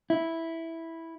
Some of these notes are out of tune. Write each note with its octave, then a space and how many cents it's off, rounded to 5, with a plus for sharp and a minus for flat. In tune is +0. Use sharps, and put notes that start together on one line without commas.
E4 -5